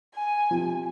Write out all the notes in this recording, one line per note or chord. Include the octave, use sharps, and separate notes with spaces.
G#5
C3 F3